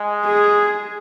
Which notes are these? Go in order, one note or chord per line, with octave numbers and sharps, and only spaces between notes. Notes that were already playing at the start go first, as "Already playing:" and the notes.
Already playing: G#3
G#4